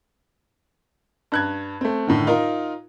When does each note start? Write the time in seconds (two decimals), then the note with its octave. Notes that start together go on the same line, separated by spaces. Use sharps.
1.32 G2 F#6 G#6
1.81 A3 C4
2.07 A2 D3 D#3
2.27 D#4 F4 A#4